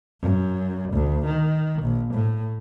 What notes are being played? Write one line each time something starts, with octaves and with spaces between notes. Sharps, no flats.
F#2
D2
D#3
A#1
A2